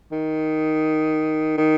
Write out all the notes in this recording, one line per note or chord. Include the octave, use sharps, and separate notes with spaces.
D#3
D#3